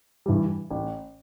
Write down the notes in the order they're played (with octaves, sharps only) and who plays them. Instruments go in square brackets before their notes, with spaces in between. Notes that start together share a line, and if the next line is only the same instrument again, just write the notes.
[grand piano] G2 E3 G3
A1